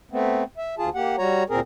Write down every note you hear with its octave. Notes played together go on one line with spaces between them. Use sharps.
A3 B3 C4
E5
D2 F4 G#4 A5
A#3 G4 F#5
G3 F#4 C#5 A#5
D2 A#2 C4 G#4 A#4